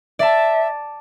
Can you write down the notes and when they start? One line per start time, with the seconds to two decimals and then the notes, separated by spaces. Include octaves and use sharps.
0.19 D5 E5 A5